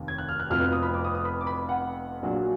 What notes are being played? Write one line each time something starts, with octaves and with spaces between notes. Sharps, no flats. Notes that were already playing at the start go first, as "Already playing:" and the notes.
Already playing: F1 D#2
G#6
F#6
F6
F#6
F1 F2 F3 B3 F6
F6
D#6
B5
D6
D#6
D#6
B5
D6
B5
F#5
A#1 A#2 F#3 D4